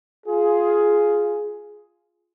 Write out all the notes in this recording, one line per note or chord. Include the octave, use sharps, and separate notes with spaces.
F4 G#4